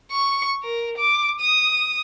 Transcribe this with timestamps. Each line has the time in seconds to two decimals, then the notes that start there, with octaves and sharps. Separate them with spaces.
0.11 C#6
0.63 A#4
0.98 D6
1.40 D#6